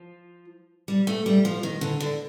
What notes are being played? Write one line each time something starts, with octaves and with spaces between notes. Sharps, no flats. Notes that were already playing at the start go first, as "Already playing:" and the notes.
Already playing: F3
G3
A3
G3
F3
D#3
D3
D3